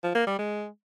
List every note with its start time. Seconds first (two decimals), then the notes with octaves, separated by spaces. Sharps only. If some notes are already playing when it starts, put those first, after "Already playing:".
0.03 F3
0.15 A#3
0.27 G3
0.39 G#3